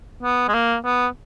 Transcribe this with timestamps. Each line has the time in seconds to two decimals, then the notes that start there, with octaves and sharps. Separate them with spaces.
0.23 B3
0.48 G#3
0.54 A#3
0.85 B3